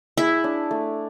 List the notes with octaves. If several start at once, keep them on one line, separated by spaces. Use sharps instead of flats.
E4 G#4
D4
A3